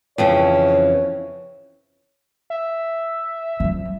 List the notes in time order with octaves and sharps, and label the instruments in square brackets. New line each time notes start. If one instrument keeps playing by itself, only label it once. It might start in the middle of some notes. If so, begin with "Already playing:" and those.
[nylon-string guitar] F2 C#3 E3 [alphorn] C#5
[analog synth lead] E5
[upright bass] F3 G3